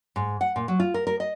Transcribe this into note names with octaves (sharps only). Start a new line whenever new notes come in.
G#2
F#5
A#2
F#3
F4
A#4
A#4
D#5